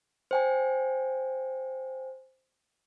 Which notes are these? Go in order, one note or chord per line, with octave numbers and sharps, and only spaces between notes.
C5 G5 G#5